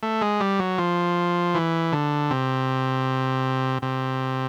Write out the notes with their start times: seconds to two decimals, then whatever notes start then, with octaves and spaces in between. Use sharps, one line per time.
0.03 A3
0.22 G#3
0.40 G3
0.59 F#3
0.79 F3
1.54 E3
1.93 D3
2.31 C3
3.82 C3